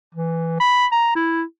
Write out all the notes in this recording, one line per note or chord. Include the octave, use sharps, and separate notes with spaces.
E3
B5
A#5
E4